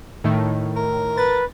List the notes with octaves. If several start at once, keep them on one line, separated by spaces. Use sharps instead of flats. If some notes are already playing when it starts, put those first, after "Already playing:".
A2 D#3 A3
A#4
B4 A6